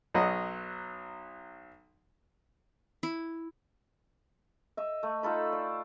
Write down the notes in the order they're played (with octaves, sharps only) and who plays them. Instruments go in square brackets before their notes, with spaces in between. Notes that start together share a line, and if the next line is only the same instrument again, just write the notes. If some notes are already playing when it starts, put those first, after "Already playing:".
[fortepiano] B1 F#3 D#5 F#5
[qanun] E4
[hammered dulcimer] D#5 E5
A3
D#4 F4 A4 B5
D5